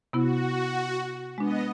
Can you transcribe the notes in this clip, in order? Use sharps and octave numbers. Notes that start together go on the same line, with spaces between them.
C3 B3 E4 F#4
G#3 B3 D4 D#5